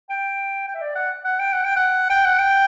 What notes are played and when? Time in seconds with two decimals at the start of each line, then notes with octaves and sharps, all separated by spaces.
0.10 G5
0.68 G5
0.75 E5
0.81 D5
0.95 F#5
1.24 F#5
1.39 G5
1.52 F#5
1.64 G5
1.76 F#5
2.10 G5
2.25 F#5
2.38 G5